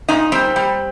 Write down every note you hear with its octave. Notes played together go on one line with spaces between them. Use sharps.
A#2 D#4
G3 C4
G3